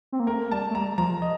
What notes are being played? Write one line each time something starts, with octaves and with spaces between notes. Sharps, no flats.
C4
A#3
A3 A#4
G3 A5
A3
G3 A#5
F3 A#5
D#5